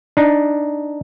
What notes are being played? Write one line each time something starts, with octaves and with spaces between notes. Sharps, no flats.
D4 D#4